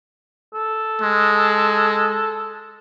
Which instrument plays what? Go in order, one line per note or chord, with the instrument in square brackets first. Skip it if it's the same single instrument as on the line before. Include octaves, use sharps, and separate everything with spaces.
[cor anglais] A4
[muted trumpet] G#3